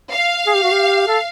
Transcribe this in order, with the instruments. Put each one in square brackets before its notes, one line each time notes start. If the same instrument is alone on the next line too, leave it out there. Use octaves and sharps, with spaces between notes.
[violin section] F5
[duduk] G#4
G4
F#4
G4
A4